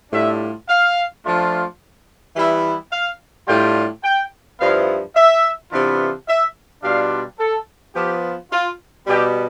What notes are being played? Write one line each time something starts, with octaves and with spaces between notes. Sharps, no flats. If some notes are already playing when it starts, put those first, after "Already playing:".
A2 G3 D4 F4 E5
F5
F3 A3 D4 F4
E3 G3 B3 E4 E5
F5
A2 G3 D4 F4 G5
G5
G2 F3 B3 E4 F5
E5
C3 E3 B3 D4 F4
E5
B2 G3 D4 F4 F5
A4
F3 B3 F4 G4
F4
B2 G3 B3 G4